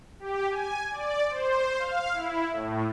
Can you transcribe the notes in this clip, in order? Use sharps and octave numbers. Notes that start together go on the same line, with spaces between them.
G4
G#5
D5
C5
F5
E4
A2